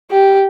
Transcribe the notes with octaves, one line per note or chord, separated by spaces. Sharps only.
G4